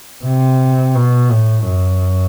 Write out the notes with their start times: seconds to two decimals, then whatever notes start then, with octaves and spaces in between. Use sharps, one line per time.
0.25 C3
0.95 B2
1.31 A2
1.66 F#2